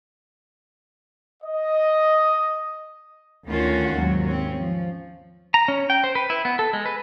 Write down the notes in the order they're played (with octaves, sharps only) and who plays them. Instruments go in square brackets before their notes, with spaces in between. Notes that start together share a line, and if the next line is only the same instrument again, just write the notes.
[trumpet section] D#5
[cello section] D2 D#3 C#4 F4 F#4
D#2 G#2 F#3
C4 C#4
F3
[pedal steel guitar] A#5
C#4
G5
C5
B4
E4
B3
A4
G#3
B4